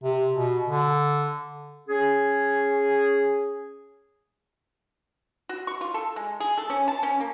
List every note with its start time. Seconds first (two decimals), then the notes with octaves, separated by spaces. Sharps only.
0.03 C3
0.33 B2
0.66 D3
1.88 C#4 G#4
5.49 F#4
5.67 C#6
5.81 F4
5.94 A4
6.16 G#3
6.40 G#4
6.58 A4
6.70 C#4
6.88 A5
7.03 C#4
7.20 A#3